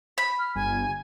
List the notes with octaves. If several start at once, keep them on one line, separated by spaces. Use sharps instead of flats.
B5 B6
F6
G1 G#5